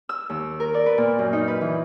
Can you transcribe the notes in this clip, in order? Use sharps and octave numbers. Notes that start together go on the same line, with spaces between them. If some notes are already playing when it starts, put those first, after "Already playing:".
E6
D#2
A#4
D5
B4
A#2
F#2
D#4
B4
E3